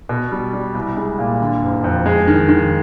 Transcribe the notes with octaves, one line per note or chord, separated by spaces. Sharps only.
B2
G3
G3
C2
G#3
A#2
D3
F#1
F2
G#3
D#3
D#3